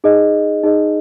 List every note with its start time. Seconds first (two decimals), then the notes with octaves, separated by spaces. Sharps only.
0.04 D#4 G#4 D#5
0.64 D#4 G#4 D#5